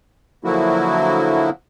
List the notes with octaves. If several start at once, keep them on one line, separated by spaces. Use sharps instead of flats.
D3 F3 F#3 A#3 E4 F#4